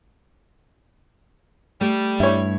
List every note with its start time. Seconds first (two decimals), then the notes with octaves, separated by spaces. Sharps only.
1.81 G3 A3
2.20 G2 E4 C#5